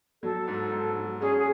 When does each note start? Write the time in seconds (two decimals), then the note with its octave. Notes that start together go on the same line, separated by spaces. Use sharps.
0.23 F#3 A4
0.47 G#2
0.72 G#2
0.96 F#3
1.21 C#4 G#4
1.38 G#4